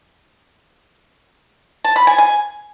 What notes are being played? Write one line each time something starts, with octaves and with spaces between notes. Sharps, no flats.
A5
B5
G#5
G#5